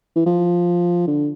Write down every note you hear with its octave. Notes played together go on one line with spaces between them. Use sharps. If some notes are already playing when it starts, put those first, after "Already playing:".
E3
F3
D3